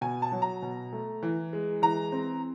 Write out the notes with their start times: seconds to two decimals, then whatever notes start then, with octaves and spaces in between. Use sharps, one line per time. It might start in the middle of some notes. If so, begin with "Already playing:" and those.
0.01 B2 G#5
0.22 A5
0.32 F#3
0.42 A#5
0.62 B2
0.93 A3
1.23 E3
1.53 G#3
1.82 E3 A#5
2.12 C4